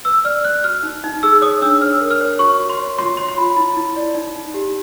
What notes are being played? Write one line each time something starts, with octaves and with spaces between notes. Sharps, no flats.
B4 E6
D5 F6
D5 F#6
F#4 F6
D#4
D#4
G#4 E6
C#5 D#6
D4 E6
C#5 F6
A#4
F6
C#5
F#4 C#6
F#4
C6
C#5
F4 C6
C#5 C6
C6
F4 B5
E4
E4
D5
D#4
D#4
G4